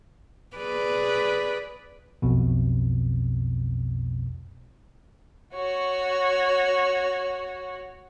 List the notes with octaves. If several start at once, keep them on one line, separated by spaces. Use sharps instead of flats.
G#4 B4 D5
B1 F2 B2
F#4 C#5